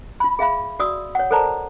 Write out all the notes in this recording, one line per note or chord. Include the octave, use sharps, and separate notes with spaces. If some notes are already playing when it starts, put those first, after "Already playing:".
F4 B5
G#4 E5 F5 B5
F#4 D5 D#6 E6
C#5 F#5
A4 A#4 C5 D5 A5 A#5